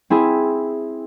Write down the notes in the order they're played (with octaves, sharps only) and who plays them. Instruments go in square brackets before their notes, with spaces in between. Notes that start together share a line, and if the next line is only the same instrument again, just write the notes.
[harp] C4 E4 G#4